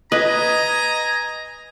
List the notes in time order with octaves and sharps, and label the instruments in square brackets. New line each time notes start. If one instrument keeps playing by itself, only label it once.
[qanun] B4 [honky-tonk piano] D#5 [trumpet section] G#5 A#5